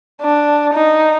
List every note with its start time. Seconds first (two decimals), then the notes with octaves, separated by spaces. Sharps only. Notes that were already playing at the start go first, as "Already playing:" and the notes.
0.22 D4
0.73 D#4